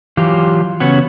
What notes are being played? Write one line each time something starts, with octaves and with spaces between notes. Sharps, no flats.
E3 F#3 F4 G4
C#3 B3 C#4 F#4